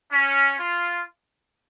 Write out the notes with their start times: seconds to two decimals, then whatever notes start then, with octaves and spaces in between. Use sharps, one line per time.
0.12 C#4
0.59 F4